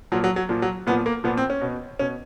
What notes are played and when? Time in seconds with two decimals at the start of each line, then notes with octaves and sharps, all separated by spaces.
0.12 A#2 F3 F#3
0.24 F#3
0.36 F#3
0.49 A#2 F3
0.62 F#3
0.87 A#2 F3 B3
1.06 A#3
1.24 A#2 F3 B3
1.37 C4
1.50 C#4
1.61 B2
1.99 B2 C#4